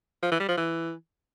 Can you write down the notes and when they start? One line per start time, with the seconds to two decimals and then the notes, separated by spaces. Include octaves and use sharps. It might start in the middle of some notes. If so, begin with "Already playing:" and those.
0.23 F3
0.31 E3
0.40 G3
0.48 F3
0.57 E3